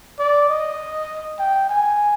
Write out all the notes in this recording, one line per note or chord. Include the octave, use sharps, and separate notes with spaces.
D5
D#5
G5
G#5